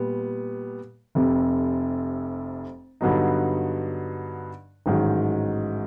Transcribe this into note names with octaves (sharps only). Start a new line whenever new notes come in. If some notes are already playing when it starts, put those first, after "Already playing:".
Already playing: A#2 G3 B3
F1 F2 C3
G2 D3 F#3 B3 D#4
A1 G#2 D#3 F#3